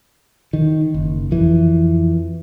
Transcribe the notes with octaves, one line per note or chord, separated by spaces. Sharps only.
D#3
F#1
F2 E3